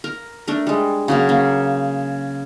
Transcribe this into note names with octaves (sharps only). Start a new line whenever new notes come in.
A#4
A3 D4 A#4
G3 G#3
C#3 F#3 A#3
A#3 C#4